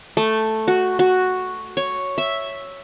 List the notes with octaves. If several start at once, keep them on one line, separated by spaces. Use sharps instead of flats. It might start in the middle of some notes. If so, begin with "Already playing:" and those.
A3
F#4
F#4
C#5
E5